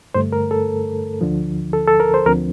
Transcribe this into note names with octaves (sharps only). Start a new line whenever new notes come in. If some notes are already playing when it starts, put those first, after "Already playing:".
G2 D3 A3 C5
A#4
A4
D2 D3 F3
A4
A4
A#4
C5
D2 D3 F3 C4 A#4